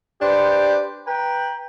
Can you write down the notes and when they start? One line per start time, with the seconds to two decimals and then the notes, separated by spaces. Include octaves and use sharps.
0.20 D4 G4 B4 C5
1.06 B4 G5 A#5